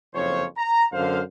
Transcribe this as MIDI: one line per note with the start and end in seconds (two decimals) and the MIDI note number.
0.14 0.44 30
0.14 0.44 41
0.14 0.44 53
0.14 0.44 72
0.14 0.44 73
0.57 0.86 82
0.93 1.21 42
0.93 1.21 50
0.93 1.21 72
0.93 1.21 77